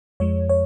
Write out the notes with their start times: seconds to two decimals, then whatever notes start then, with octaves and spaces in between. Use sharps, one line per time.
0.20 F2 F3 G#3 C#5
0.49 C#5